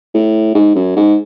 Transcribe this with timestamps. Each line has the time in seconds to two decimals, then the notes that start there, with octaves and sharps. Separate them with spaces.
0.14 A2
0.55 G#2
0.75 F#2
0.97 G#2